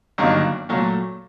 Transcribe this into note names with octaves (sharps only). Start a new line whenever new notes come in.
G1 G2 D#3 F#3 A#3
A#2 F#3 A3